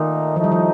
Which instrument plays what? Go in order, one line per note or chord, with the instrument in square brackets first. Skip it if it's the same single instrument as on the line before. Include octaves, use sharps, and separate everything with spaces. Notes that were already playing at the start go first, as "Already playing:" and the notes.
Already playing: [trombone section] A#2 A3 D#4 [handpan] D#3
[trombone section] A2 A3 D#4 [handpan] F3
[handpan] G3
F3